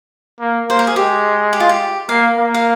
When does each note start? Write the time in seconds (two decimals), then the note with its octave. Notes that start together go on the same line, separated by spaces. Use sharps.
0.40 A#3
0.68 A#3 C5
0.79 A#4
0.87 G#4
0.96 G#3 G4
1.53 G4
1.60 F4
1.69 G4
2.09 A#3 F5
2.37 A#3
2.54 F5